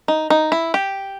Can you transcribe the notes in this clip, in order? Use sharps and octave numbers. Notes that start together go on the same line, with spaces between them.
D#4
D#4
E4
G4